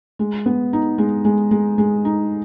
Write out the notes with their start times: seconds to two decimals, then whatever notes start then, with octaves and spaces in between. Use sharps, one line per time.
0.19 G#3
0.46 B3
0.73 D#4
0.98 G#3
1.25 G#3
1.51 G#3
1.78 G#3
2.05 D#4